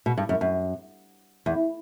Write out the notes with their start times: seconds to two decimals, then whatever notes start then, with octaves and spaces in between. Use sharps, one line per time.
0.06 B2
0.17 G2
0.29 F#2
0.41 F#2
1.46 E2